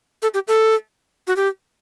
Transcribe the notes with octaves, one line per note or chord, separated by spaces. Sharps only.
A4
G4
A4
F#4
G4